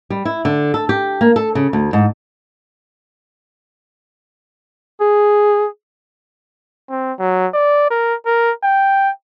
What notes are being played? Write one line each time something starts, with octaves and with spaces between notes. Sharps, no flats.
G3
E4
D3
A4
G4
A#3
A4
C#3
D2
G#2
G#4
C4
F#3
D5
A#4
A#4
G5